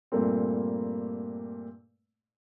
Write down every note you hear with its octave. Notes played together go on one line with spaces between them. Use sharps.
G2 A#2 A3 A#3 C4